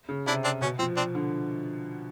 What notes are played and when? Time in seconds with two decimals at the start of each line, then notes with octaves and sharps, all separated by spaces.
0.09 C#3
0.26 C3 D4 E4
0.44 C4 D4
0.61 B2 C#4
0.79 F3 C4
0.96 C4 D4
1.15 D3